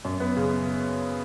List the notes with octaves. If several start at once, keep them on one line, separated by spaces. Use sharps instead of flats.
F#2
B3
C#3